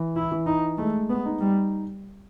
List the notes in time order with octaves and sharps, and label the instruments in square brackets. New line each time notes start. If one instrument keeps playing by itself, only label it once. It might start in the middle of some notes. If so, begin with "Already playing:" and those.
Already playing: [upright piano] E3
[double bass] E4
[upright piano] E3
[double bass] D#4
[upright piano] G#3 [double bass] A3
[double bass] B3
[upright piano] D#4
[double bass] G3